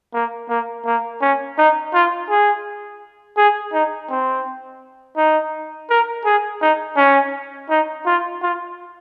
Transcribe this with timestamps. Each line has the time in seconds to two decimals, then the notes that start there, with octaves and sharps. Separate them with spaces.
0.14 A#3
0.49 A#3
0.86 A#3
1.21 C#4
1.58 D#4
1.94 F4
2.29 G#4
3.37 G#4
3.73 D#4
4.10 C4
5.17 D#4
5.90 A#4
6.25 G#4
6.62 D#4
6.97 C#4
7.70 D#4
8.06 F4
8.42 F4